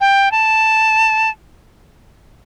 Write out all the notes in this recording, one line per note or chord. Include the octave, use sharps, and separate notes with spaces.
G5
A5